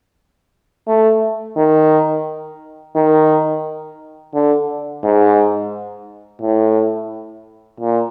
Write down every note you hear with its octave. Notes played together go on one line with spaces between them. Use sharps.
A3
D#3
D#3
D3
G#2
A2
A#2